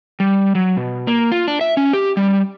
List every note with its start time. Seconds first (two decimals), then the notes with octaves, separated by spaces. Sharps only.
0.20 G3
0.55 F#3
0.77 B2
1.07 A#3
1.32 F4
1.48 D4
1.61 E5
1.77 C#4
1.93 G4
2.17 G3